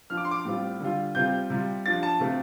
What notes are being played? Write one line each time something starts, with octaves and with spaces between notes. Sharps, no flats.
F3 D4 F4 F6
D6
C6
D6
A2 G3 C4 F4
D3 G3 F4
C3 G3 C4 F4 G6
C3 G3 F4
F3 D4 F4 A6
A5
C3 A3 C4 F4